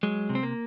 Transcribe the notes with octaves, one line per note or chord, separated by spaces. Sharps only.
F#3 G#3
C3
C4
A#3